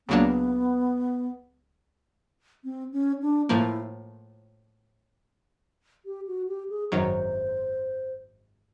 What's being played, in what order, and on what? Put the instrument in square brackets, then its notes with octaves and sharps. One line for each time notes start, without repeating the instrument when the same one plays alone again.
[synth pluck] C#2 C#3 F#3 A#3 D4 [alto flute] B3
[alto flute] C4
C#4
D4
[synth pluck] A2 F3 A#3 [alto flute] E4
[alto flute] G4
F#4
G4
G#4
[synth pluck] G#1 F#2 D#3 F#3 [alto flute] C5